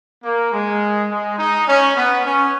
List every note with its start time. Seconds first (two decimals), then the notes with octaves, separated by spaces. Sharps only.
0.24 A#3
0.52 G#3
1.10 G#3
1.39 D#4
1.68 C#4
1.95 B3
2.24 C#4